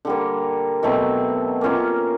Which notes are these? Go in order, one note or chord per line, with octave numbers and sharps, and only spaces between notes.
D3 G3 A#3
B2 F#3 A3 C4
A#3 C#4 F4